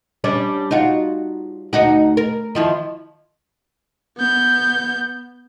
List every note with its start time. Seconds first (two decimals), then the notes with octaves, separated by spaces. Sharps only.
0.24 G3 C#4 D4
0.71 D#4 F4 F#4
1.73 D2 D#4 F#4
2.17 A#4
2.55 D#3 F3 E4
4.17 B3 G6